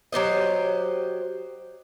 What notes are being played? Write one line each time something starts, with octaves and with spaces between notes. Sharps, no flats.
F#3 G4 C5 D#5